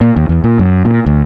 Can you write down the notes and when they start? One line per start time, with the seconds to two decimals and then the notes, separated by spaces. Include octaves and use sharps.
0.01 A#2
0.16 D#2
0.29 E2
0.44 A#2
0.59 F#2
0.85 A#2
1.06 D2